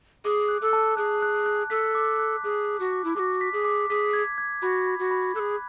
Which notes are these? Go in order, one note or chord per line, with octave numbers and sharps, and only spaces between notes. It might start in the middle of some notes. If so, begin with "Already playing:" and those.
G#4 D6
F#6
A4
A5
G#4 F#6
F#6
F#6
A4 B6
D6
F#6
G#4 F#6
D6
F#4
D6
E4
F#4 G#4 D6
B6
G#4
D6
G#4 B6
G#6
G#6
F#4 B5
B5
F#4
B5
G#4 A4 F#6